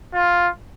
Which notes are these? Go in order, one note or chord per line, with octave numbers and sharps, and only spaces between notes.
F4